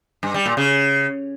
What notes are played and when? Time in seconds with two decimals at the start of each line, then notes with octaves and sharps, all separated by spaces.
0.23 G2
0.34 G3
0.46 A#2
0.57 C#3